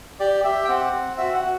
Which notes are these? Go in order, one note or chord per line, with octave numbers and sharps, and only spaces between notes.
G4 D5
G4 E5
G5
C4 F#5
C4
F#4 E5
F#5
F#4